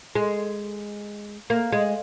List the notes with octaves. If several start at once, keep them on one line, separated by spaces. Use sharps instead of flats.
G#3
A#3
G#3